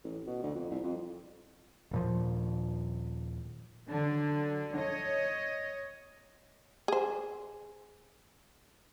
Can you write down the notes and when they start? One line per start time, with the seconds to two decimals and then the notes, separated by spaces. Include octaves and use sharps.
0.04 A1
0.27 B2
0.43 D2
0.55 F2
0.70 C2
0.84 F2
1.91 D#1 A#2 F3
3.89 D3 F#3
4.76 C#5 D#5
6.88 G#4 C5